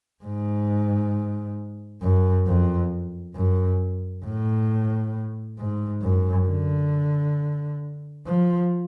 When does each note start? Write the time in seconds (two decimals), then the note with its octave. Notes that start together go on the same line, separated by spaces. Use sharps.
0.24 G#2
2.02 F#2
2.47 F2
3.35 F#2
4.25 A2
5.59 G#2
6.03 F#2
6.48 D3
8.27 F3